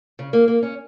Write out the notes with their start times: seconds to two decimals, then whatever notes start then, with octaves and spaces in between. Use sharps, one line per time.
0.19 C#3
0.33 A#3
0.48 A#3
0.63 C#4